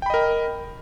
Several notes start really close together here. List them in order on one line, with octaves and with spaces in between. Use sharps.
G5 B5 D#5 A#4